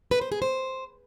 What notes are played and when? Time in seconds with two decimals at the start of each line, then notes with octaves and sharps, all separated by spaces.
0.11 B4
0.21 C5
0.32 G#4
0.42 C5